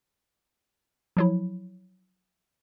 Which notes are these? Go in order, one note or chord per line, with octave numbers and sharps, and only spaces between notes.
F3 F#3 E4